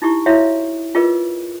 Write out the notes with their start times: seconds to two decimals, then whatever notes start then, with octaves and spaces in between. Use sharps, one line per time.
0.02 D#4 E4 G4 C#6
0.26 E4 F#4 C#5 E5 F5 B5
0.95 F4 G#4 A#4 B4 D#5